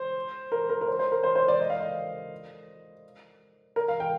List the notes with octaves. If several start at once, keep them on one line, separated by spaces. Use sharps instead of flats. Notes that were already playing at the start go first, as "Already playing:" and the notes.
Already playing: C5
A#4
A#4
A#4
C5
C5
A#4
C5
C5
D5
D#5
F5
D#5
A#4
F5
G5